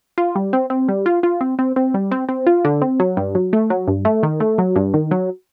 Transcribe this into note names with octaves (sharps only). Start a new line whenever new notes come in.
F4
G3
C4
C4
G3
F4
F4
C4
C4
C4
G3
C4
C4
F4
D3
C4
F#3
G2
F#3
A3
F#3
G2
A3
D#3
A3
F#3
G2
D#3
F#3